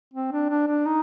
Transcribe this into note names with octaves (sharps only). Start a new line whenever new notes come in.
C4
D4
D4
D4
D#4